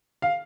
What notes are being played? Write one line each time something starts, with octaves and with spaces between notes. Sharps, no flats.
F5